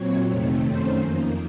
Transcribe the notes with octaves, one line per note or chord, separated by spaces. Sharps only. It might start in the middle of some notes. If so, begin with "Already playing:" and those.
Already playing: A#2 F#3 C4 C#5
F2 C3 D#3 A3 C4
F#2 D#3 A3 C#4 C5
F2 D#3 A#3